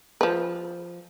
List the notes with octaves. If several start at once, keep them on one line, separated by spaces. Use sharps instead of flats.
F3 B4